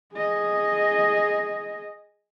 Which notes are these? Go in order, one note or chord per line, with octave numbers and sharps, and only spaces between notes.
G#4 D#5